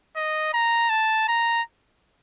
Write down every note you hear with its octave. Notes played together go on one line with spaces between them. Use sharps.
D#5
A#5
A5
A#5